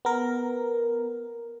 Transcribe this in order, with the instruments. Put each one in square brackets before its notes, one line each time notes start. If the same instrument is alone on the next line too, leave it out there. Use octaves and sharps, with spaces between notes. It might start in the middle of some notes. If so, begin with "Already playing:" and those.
[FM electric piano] B3 A#4